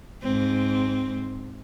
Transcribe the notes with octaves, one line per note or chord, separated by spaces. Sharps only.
G#2 C4